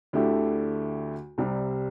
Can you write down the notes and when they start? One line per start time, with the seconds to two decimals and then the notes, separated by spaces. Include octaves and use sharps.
0.13 D2 D3 A3 E4 G4
1.38 C2 C3 G3 C4